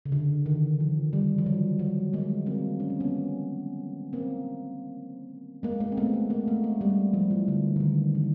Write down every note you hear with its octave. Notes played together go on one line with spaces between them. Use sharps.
C#3
D3
D#3
F3
G3
F3
F#3
F#3
G#3 A#3
A#3 C4
C#4
C4
B3 C#4
A#3 C4
G#3 A#3
G#3 A#3
C4
A3 B3
A3
G#3 A#3
A3
G#3
G3
F3
E3
D3
D#3
D3
E3